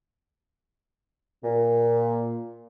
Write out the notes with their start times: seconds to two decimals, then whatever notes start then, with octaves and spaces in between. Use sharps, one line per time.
1.43 A#2